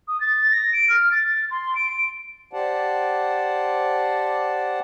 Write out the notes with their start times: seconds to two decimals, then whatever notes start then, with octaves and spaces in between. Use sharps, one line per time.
0.08 D#6
0.21 A6
0.51 A#6
0.73 D7
0.90 F6
1.12 A6
1.51 C6
1.75 D7
2.53 G4 C5 D5 F#5 A5